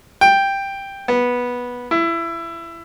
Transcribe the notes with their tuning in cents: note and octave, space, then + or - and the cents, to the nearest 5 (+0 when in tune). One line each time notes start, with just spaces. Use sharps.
G5 +5
B3 -10
E4 +20